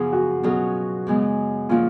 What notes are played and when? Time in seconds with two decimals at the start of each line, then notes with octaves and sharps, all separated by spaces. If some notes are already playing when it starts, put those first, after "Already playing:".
Already playing: F#2 C#3 F3 B3 F4 G#4
0.13 F#4
0.43 B2 F#3 C#4 F4 G#4
1.07 F#2 C#3 G#3 B3
1.69 A#2 F3 A#3 C#4 F4